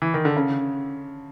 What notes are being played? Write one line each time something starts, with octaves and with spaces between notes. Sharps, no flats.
E3
D#3
D3
C#3